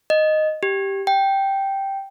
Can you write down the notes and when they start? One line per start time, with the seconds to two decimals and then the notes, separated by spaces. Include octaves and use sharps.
0.10 D#5
0.63 G4
1.07 G5